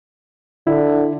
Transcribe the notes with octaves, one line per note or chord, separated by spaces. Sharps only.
D3 E4